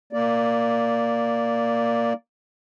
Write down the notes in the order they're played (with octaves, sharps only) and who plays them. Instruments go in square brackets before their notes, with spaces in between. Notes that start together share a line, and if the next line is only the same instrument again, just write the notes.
[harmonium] A#3 D5